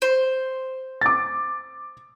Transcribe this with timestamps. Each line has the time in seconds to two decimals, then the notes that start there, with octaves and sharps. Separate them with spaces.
0.02 C5
1.01 D6 A6